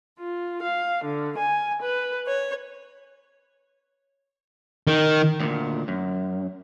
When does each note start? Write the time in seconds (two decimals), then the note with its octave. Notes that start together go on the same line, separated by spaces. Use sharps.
0.19 F4
0.62 F5
1.04 D3
1.38 G#5
1.82 B4
2.26 C#5
4.87 D#3
5.40 D2 A#2
5.88 F#2